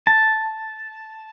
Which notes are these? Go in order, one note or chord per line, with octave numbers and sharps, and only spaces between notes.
A5